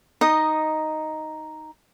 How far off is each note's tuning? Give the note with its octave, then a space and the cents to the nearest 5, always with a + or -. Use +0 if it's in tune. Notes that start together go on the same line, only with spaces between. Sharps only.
D#4 +0 D#5 +0 D#6 -10